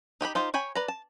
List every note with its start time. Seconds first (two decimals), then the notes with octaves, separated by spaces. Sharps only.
0.21 D#4 G4 G5 B5
0.35 D#4 F4 G4 C5
0.54 C#5 G5 G#5 B5
0.75 B4 D5 A#5
0.88 A5